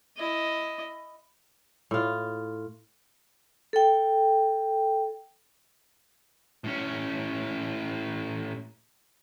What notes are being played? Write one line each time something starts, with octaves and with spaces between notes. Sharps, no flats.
E4 D#5
A2 F4
A4 G5
A2 C#4